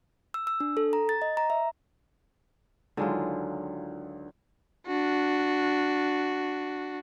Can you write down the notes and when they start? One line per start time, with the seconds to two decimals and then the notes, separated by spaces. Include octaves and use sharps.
0.34 E6
0.47 E6
0.60 D4
0.77 A4
0.93 A#5
1.09 A6
1.22 D#5
1.37 A#5
1.50 E5
2.97 C#2 D3 D#3 F#3 G#3 F4
4.87 D4 F#4